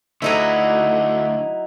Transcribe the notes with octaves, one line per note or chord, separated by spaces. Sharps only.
D3 F#3 A3 D#4 E4